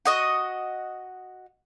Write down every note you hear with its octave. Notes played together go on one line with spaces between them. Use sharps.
F#4 D#5 F#5